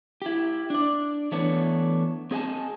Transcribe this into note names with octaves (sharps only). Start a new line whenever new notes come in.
E4 G4
D4 D5
E3 A3 B3 D4 C#5
C4 G#4 D#5 F#5 G#5 A5